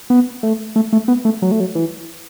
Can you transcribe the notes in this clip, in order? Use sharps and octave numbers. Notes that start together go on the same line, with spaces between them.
B3
A3
A3
A3
B3
A3
F#3
A3
F#3
E3